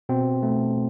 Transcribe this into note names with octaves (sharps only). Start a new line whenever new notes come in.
B2 C4
A3